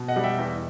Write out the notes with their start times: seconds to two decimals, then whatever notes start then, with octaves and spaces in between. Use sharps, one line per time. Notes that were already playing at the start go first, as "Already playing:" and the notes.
Already playing: B2
0.08 D#5 F#5
0.16 G3
0.23 E5 G5
0.39 E2